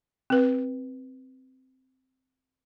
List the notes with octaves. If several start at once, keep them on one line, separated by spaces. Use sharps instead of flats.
C4 B4